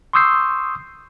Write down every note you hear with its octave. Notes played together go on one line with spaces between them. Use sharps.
C6 C#6 D#6 E6 G6 C7